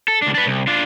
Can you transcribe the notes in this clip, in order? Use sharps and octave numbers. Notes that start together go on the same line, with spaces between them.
A4
C#2 D4
D4 B4
C2
D4 F4